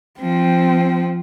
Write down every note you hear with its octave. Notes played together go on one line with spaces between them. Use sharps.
F3 C4